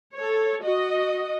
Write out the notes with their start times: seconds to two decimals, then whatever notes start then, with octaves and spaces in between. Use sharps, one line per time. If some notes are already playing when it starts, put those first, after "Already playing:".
0.16 A4 C#5
0.62 F#4 D#5